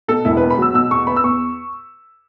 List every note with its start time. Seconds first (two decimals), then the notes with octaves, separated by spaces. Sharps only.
0.08 B2 A4
0.25 E1 E4
0.37 E2 B4
0.50 B5
0.58 F#3 E6
0.74 B2 E6
0.90 E2 C#6
1.07 B3 B5
1.16 E6
1.24 E2 C#6